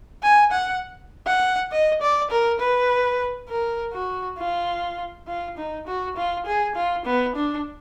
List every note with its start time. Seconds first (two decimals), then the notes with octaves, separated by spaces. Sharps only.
0.23 G#5
0.52 F#5
1.27 F#5
1.72 D#5
2.02 D5
2.31 A#4
2.60 B4
3.49 A#4
3.93 F#4
4.38 F4
5.28 F4
5.58 D#4
5.87 F#4
6.17 F4
6.46 G#4
6.75 F4
7.06 B3
7.36 D4